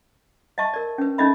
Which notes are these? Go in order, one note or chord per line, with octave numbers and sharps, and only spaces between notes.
D#5 E5 A5 C#6
A#4 D5
C#4 B4
C#4 D#4 A4 D#5 E5 B5